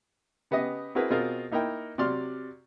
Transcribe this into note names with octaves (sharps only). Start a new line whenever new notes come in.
C#3 B3 G4 D#5
C4 E4 F#4 G#4 A#4 B4
B2 C4 F4 G#4 A#4
A#3 D#4 E4 A#4 G5
C3 F#3 D5 C6 F6